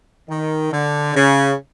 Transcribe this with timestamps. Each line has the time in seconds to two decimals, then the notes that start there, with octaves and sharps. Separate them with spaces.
0.29 D#3
0.72 D3
1.14 C#3